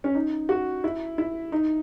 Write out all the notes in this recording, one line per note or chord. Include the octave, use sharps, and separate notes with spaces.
C#4
D#4
F#4
E4
E4
D#4